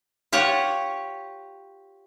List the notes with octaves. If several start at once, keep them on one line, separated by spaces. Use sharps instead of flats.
F4 G4 C#5 F#5